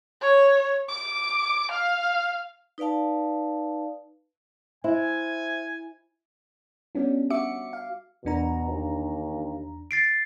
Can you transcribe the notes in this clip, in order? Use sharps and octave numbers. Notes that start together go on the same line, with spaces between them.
C#5
D6
F5
D#4 B4 D5 F5 A5
E4 C5 E5 G#5
G3 B3 C#4 D4
F#4 E5 D6 C#7
F5
E2 B2 D4 A#5
D#2
A6 C7 D7